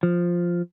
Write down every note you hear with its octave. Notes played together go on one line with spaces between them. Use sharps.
F3